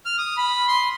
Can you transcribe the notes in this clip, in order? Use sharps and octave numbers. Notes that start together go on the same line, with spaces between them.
F6
D#6
B5
C6